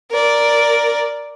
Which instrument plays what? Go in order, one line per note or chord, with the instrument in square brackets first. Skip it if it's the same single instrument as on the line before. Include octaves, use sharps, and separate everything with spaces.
[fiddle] A#4 D5